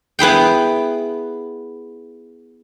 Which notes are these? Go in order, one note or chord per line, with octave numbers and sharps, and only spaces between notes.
B3 E4 G#4 G5